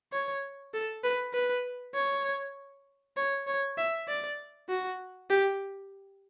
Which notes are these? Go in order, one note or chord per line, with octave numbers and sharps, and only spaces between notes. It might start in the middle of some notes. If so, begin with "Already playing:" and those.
C#5
A4
B4
B4
C#5
C#5
C#5
E5
D5
F#4
G4